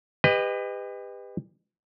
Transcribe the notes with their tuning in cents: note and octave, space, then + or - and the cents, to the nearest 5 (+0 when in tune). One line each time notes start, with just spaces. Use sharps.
G4 +35 B4 +20 D#5 -10